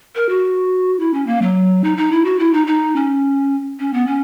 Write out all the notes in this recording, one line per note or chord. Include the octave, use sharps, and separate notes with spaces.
A#4
F#4
E4
C#4
A#3
F#3
D#4
D#4
E4
F#4
E4
D#4
D#4
C#4
C#4
B3
C#4